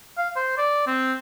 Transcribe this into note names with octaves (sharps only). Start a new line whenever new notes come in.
F5
C5
D5
C4